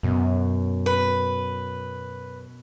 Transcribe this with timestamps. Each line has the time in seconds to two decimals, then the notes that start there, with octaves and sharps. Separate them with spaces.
0.03 F#2 B2
0.86 B4